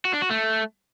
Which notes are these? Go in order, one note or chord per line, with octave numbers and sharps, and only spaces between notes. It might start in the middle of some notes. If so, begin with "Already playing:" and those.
F#4
D4
F#4
A3